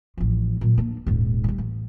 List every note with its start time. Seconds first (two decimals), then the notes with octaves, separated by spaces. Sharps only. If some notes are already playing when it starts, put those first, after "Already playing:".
0.18 A1 F3
0.61 A#2 F#3
0.78 A#3 D4
1.06 D#1 G#2
1.44 D2 G3
1.58 A1